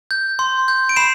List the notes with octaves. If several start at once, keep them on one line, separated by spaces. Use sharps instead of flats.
G6
C6
G6
D7
B5 C7 E7